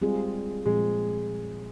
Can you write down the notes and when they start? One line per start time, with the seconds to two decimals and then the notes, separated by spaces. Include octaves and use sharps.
0.01 G3 G#3 C4 F4 G#4
0.66 A#2 F3 G#3 C4